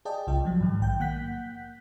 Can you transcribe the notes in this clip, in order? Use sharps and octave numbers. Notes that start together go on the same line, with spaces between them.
G#4 D5 D#5 G5 A5
C2 C#3 F4 G5
F3 F#3
G#2 D#3
A#1 G5 G6
A#3 F#5 F#6 G6 B6